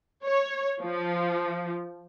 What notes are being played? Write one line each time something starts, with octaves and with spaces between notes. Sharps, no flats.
C#5
F3